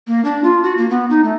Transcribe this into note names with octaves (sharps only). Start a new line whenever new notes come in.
A#3
D4
F4
F#4
A#3
B3
D#4
A3